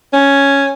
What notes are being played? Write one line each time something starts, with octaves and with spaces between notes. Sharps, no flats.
C#4